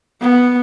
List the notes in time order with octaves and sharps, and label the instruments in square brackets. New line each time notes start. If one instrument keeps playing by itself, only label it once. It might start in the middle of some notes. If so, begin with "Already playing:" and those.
[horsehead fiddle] B3